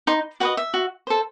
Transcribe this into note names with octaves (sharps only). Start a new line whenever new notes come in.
D#4 C6
F#4 B4 D#5 F#5
E5
F#4
A4 C5